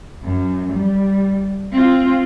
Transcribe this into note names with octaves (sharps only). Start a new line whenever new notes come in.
F#2
G3
C4 F4